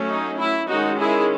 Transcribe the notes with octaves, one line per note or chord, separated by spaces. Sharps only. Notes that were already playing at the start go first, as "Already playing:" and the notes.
Already playing: F#3 A3 C#4
D#4
E4
D#3 G#3 C#4 D#4 F#4
E4 G#4